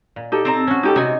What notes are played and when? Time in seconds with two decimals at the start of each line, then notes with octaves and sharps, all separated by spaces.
0.16 A#2
0.32 D#4 G4 A4
0.45 C4 A5 A#5
0.67 C#4 F#4
0.83 D#4 G4 A4
0.96 C3 D#4 F#4 G#5